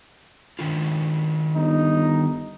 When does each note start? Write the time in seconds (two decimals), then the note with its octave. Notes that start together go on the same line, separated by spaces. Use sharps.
0.59 D#3 D4 F4
1.56 G1 D#4